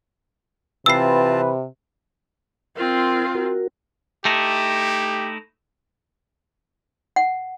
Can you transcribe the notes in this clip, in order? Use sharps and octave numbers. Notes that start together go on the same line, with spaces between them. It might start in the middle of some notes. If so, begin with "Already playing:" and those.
C3 E3 C4 F4 B4 A5 E6 C7
C4 F4 A#4
F#4 A#4
A3 D#4 E4 G4
F#5